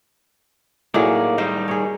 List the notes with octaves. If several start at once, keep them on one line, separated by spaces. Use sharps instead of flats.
A2 F#3 A#3 D#4 G#4 D5
D#3 G3 D#4 C5
G#4 C#5